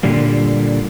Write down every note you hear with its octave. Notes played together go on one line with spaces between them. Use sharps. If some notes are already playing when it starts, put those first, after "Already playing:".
A#2 D3 G3 A#3